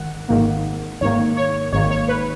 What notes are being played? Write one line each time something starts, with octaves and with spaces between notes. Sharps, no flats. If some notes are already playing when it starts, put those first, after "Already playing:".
Already playing: G#1 G#2 D#3 F#5
G#1 G#2 D#3 A#3
G#1 G#2 D#3 A#3 C#5
C#5
G#1 G#2 D#3 A#3 C#5
C#5
B4